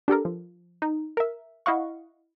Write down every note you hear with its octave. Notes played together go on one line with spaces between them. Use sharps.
D4 G4 A4 A#4
F3
D#4
A#4 E5
E4 D#5 F5 F#5 C#6